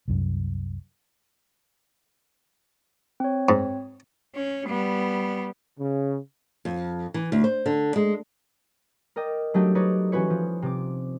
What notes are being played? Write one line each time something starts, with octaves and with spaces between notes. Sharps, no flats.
C2 F#2
C4 C#5
G#2
C#4
G3 B3
C#3
F2
E3
D2
C5
D3
G#3
A#4 D5 D#5 G5
F#3 A3 D4 D#4 G4 A4
D#4 B4 C#5 D5
E3 C#4 F#4 B4 C#5
F3
C3 D6